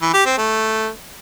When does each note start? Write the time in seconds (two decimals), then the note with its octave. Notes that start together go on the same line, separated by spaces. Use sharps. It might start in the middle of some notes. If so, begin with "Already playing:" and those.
0.02 E3
0.13 G4
0.25 C4
0.37 A3